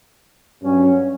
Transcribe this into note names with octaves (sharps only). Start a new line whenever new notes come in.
G2 F#3 C#4